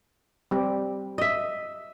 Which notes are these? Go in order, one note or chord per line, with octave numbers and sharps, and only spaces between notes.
G3 C4 G4
D#5 E5